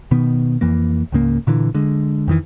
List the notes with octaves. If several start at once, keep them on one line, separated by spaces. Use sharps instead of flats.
B2 D#3 B3
F2 E3 A#3
C#2 G#2 C#3 A#3
A#2 D3 E3
D3 G#3
F2 D#3 E3